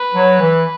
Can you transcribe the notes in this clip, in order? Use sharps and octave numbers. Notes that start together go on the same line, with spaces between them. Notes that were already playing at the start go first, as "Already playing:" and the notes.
Already playing: B4
F#3
E3